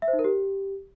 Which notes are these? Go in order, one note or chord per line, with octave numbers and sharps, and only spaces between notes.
E5
C5
D#4
A#4
G4